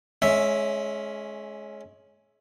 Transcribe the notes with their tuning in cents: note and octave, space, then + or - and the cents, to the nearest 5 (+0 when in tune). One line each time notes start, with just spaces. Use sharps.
G#3 +25 C#4 +0 E5 +0